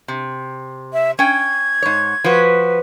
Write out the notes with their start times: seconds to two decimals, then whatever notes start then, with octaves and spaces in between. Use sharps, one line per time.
0.08 C3
0.93 E5
1.19 C#4 G5 G#6
1.82 G#2 C#5
2.24 F3 F#4 B4